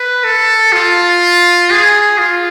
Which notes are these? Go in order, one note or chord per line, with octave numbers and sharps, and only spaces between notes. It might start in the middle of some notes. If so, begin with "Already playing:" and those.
Already playing: B4
A4
F4
G#4
F4